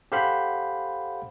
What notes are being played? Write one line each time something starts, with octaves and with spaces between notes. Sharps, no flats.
G4 A4 C5 F5 F#5 B5